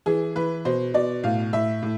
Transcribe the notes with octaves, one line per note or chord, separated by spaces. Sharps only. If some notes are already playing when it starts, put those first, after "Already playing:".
E3 G#4
E3 B4
B2 C5
B2 D5
A2 F5
A2 E5
A2